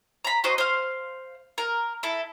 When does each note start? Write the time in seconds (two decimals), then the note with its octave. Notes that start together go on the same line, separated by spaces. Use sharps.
0.24 A#5 B5
0.44 F#4 C5 D#5
0.58 C5 F5
1.58 A#4
2.03 E4 A4